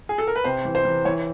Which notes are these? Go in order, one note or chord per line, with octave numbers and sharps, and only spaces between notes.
G#4
A4
A#4
B4
C3 C5
E3
C5
E3
E3 C#5